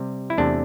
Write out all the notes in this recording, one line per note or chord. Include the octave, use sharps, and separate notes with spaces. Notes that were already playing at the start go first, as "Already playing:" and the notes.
Already playing: C3 G3
E4
E2 C3 A3 D4